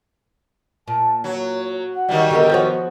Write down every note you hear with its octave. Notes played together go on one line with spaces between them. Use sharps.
A#2 A5
F#3 C#5
F#5
D#3 F#3 G3
D3 B3 G4 A#4
F3 F#4 C#5